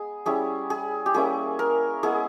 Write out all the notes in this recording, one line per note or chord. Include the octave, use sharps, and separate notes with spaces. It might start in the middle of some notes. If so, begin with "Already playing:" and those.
Already playing: G#3 B3 G#4
G3 C#4 E4 G#4
G#4
G4
G3 A#3 C#4 E4 G#4
A#4
G#3 B3 E4 G#4